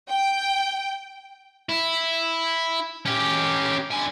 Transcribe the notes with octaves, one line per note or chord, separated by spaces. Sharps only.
G5
E4
C#4 G4
D3 G#5